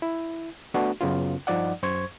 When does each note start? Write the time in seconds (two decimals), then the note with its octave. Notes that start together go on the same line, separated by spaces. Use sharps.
0.02 E4
0.74 A3 B3 D4 F#4
1.01 F#2 C#3 B3 C#4 F4
1.47 G2 F3 D#4 D5 F#5
1.82 F#2 C5 C#6 G#6